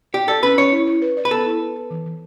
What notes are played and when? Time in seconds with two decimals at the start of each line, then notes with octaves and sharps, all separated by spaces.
0.14 G4 D5
0.28 A4 D5
0.43 C#4 B4
0.58 C#4 C#5
0.72 E4
0.87 E4
1.02 B4
1.17 D5
1.25 B4
1.31 B3 A4
1.46 E4
1.62 B4
1.76 B4
1.90 E3
2.05 E3